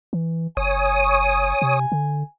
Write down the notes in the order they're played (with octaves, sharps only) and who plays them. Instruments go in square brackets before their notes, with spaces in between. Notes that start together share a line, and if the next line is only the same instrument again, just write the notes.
[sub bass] E3
[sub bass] F#1 [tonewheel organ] C#5 D#6 [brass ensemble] G#5
[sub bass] C3
D3